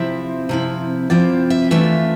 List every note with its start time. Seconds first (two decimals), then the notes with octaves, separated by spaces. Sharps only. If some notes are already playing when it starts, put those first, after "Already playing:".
Already playing: C3 F3 C4 E4 E5
0.49 C3 F3 C4 E4
1.10 C3 F3 C4 E4 D5
1.50 E5
1.71 E3 A3 D4 F4 E5